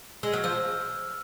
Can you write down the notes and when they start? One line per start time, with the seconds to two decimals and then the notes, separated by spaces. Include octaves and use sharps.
0.23 G#3 E6
0.32 F#3 F6
0.44 F3 E6